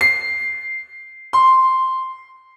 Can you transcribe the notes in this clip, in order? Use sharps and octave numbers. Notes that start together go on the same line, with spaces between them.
C7
C6